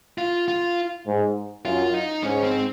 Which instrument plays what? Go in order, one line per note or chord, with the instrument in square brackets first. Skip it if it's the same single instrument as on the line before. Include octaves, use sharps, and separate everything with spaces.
[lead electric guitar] F4
F4
[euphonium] G#2
[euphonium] F#2 [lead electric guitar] F4
[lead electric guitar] D#4
[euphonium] G#2 [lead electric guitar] C#4
[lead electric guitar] C4